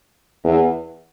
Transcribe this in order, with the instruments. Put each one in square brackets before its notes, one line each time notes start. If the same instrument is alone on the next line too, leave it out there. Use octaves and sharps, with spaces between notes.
[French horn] E2